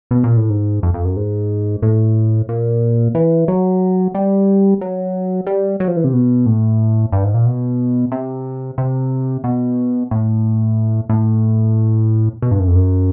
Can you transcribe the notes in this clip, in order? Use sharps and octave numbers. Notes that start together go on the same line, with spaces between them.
B2
A#2
A2
G#2
F2
F2
F#2
G#2
A2
A#2
E3
F#3
G3
F#3
G3
F#3
F3
E3
C3
B2
A2
G2
G#2
A#2
B2
C3
C3
B2
A2
A2
B2
G2
F#2
F2
F#2